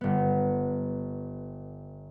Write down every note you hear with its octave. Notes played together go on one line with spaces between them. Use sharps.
G1 B3